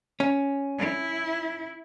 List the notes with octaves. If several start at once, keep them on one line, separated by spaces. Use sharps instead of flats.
C#4
E4